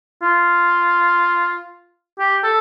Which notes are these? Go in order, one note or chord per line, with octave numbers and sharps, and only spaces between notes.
F4
G4
A4